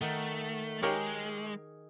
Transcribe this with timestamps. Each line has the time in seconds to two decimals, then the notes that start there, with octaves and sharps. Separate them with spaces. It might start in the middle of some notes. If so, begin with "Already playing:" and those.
0.01 D#3 A3 D#4 F#4
0.83 G#3 G4 G#4 A#4 C#5